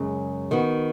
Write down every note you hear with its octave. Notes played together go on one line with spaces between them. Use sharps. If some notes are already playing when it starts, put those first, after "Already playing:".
Already playing: F#2 C#3 G#3
D#3 B3 F#4